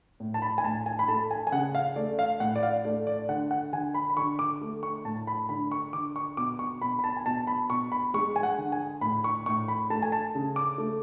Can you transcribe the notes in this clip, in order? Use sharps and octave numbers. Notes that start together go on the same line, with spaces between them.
A2
A5
B5
G#5
A2 A5
G#5
B5
A3 A5
G#5
G#5
C#3 F#5
F5
A3 D5
F5
A2 F#5
D5
F5
A3 D5
D5
D3 F#5
F#5
D3 G#5
B5
B5
D3 C#6
D6
A3
C#6
A2 A5
B5
D3 B5
C#6
D3 D6
C#6
B2 D6
C#6
B2 B5
B5
A5
G#5
B2 A5
B5
B2 C#6
B5
G#3 C#6
G#5
F#5
D3
G#5
A2 B5
C#6
A2 C#6
B5
A3 A5
G#5
A5
C#3
D6
A3